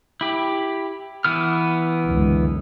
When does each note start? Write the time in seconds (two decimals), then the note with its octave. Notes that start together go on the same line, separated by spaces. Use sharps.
0.21 E4 G4
1.25 E3 B3 F6
2.05 C#2 F#2 D3